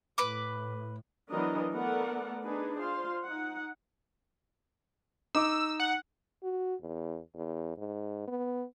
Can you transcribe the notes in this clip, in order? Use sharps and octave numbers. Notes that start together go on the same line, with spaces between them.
A2 B4 B5 D6
E3 F#3 B3 D4 A#4 D#5
A3 B3 A4 A#4 D5 F#5
D4 D#4 G#4 B4
F4 C5 F5 C6
D#4 F#5
D#4 D6 E6
F#5
F#4
E2
E2
G#2
B3